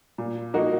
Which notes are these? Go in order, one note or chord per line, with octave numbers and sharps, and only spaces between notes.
A#2
F3 A#3 D#4 F#4